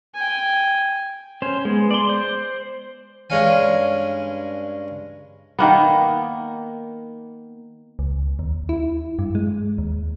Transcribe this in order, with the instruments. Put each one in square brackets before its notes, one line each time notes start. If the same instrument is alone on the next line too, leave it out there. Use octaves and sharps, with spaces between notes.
[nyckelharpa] G5 G#5
[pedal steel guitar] C#4 C5
G#3 B3
D5 C6
C5
[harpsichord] G2 G#3 C#4 F5 G#5
[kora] D#3 A#3 B3
[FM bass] C#2
D#2
E4
G2
G#3
D#2